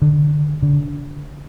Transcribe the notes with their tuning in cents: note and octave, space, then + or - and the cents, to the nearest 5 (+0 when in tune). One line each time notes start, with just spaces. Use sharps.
D3 +20
D3 -25